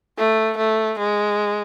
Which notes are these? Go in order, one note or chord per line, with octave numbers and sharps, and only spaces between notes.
A3
A3
G#3